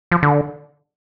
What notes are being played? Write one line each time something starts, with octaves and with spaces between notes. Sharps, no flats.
F3
D3